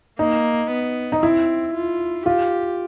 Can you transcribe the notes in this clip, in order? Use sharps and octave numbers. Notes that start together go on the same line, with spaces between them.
A#3 D#4
B3
D#4
C4 E4
F4
F4 G4